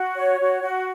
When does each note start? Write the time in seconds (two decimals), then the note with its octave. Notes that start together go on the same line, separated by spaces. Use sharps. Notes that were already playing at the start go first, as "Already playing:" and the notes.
Already playing: F#4
0.16 C#5
0.39 F#4
0.62 F#4